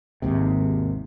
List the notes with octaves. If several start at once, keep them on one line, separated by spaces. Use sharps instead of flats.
G#1 D#2 G#2 C3